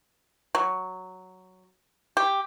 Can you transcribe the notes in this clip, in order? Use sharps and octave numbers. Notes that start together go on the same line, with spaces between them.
F#3
G4